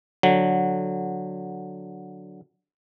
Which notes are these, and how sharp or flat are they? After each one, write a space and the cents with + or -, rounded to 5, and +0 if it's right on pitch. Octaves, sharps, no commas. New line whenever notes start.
D3 +0 F#3 -10